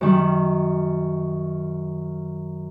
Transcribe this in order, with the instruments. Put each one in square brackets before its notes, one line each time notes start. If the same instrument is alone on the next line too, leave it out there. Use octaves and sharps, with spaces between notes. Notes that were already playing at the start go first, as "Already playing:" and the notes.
[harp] F#2 D#3 G3